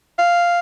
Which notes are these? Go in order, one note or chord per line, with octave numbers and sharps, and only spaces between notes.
F5